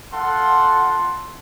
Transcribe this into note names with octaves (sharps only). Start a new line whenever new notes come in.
F4 A4 F#5 C6